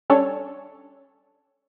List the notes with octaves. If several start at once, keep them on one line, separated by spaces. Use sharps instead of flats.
G3 C#4 D4 A4 C#5